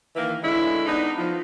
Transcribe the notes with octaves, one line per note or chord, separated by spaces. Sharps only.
D#3 E3 A#3
D3 G#3 C#4 E4
B3 D4 D#4
F3